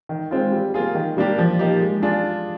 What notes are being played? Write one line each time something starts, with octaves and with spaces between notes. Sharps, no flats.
D#3
G#3 C4 F4
G3
A#3 F4 G#4
D#3
G3 A#3 D4 G4
F3
A#3 D#4 G4
G#3
D4 F4 G#4